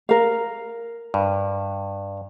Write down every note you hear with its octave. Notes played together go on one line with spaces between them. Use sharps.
A#4 F5
G2